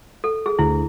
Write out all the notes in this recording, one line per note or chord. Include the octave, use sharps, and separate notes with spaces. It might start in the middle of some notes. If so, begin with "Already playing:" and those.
A4
G#4
D2 E4 G#4